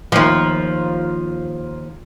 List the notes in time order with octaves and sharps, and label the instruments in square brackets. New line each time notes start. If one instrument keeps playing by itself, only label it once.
[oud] D#2 F3